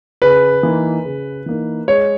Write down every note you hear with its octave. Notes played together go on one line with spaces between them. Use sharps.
C#3 B4
E3 A#3 D#4
C#3
E3 A#3 D#4
G#3 C#5